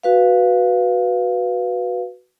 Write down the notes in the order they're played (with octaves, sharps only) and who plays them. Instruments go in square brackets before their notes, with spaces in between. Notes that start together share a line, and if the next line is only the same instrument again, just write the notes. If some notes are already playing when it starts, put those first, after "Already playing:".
[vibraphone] F#4 B4 F5